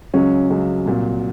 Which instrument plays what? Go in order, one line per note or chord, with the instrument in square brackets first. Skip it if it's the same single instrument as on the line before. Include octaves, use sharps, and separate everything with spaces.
[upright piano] C#2 C#3 F#3 C#4
C#2 C#3 F#3 C#4
C2 A#2 F#3